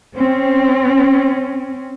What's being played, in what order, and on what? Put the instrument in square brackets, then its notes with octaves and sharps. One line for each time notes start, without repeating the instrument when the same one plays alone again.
[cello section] C4 C#4